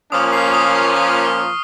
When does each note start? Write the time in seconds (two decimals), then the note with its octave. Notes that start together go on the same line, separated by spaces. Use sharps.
0.11 A#2 F3 A#3 C#4 D#6
0.33 C7
0.54 D#6
0.75 C#6
0.96 D#6
1.25 F6